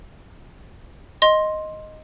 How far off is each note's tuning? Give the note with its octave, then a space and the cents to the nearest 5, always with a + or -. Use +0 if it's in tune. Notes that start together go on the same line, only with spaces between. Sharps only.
D#5 +0 C6 +10